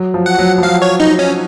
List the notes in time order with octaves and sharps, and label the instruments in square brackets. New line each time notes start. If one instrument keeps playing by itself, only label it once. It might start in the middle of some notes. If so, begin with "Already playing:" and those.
Already playing: [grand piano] F#3
F3
[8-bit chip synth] F#5
[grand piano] F#3
F3
[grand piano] F#3 [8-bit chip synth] F5
[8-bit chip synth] C#5
D#4
C#4